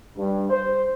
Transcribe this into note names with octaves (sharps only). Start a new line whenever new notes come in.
G2
C5